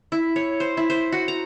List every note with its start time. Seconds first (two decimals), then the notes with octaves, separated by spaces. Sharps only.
0.12 E4
0.36 C#5
0.60 C5
0.77 E4
0.90 C5
1.12 F#4
1.28 A#5